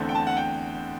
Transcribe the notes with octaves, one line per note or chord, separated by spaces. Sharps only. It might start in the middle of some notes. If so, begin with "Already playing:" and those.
Already playing: E2 D3 A3 C4
G5
A5
F#5
G5